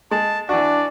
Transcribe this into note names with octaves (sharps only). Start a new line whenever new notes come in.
G#3 A5
E3 D4 F#4 D5